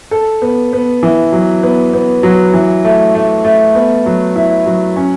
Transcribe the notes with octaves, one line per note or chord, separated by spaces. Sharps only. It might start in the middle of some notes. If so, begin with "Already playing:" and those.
A4
B3
B3
E3
F#3
B3
B3
F#3
E3
A3
A3
A3
B3
F#3
E4
F#3
C#4